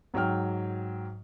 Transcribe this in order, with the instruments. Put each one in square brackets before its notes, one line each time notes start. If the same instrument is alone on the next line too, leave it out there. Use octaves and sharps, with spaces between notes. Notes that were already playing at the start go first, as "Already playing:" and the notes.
[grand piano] G#2 F#3 C#5 G5 F6